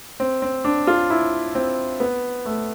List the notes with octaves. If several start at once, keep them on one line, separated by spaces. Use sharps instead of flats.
C4
C4
D4
F4
E4
C4
B3
A3